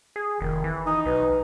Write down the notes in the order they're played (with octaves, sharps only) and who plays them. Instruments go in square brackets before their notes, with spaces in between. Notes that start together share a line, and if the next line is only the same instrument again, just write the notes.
[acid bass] G#4
[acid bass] F1 [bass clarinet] D#3
[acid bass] E3
[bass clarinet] D#4 [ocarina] D#6
[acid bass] B1 [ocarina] B4